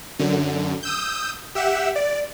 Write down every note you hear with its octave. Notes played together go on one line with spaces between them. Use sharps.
F#2 D3
D#6 E6 G6
G4 E5 F#5 E6
D5